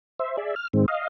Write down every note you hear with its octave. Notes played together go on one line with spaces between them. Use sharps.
C5 E5
G#4 D5 E5
F6
G#2 D#3 G#3 C4
D#5 F5